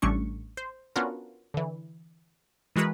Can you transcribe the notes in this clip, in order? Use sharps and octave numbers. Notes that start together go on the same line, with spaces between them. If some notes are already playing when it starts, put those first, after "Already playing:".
A1 G3 A3 C#4 D4 C#6
C5
B3 C#4 D4 F4 F#4 A#4
D3 E3
E3 G#3 F#4 A#4 B4